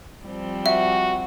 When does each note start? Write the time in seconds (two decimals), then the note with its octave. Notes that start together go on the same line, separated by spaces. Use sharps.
0.25 F3 G3 C4
0.66 F#4 E5